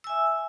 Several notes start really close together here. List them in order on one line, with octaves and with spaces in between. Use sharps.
E6 G#5 E5